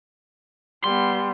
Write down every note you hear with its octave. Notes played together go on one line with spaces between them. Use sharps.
G3 B3 C6